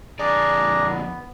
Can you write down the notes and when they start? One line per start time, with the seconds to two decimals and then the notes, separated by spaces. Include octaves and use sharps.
0.19 F2 D3 D4 G#4 D5 A#5
0.88 B3